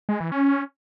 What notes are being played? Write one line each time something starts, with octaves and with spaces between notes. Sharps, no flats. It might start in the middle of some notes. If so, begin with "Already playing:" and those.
G#3
E3
C#4